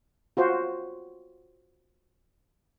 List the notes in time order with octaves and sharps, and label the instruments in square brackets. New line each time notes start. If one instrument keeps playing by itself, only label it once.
[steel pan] F4 F#4 C5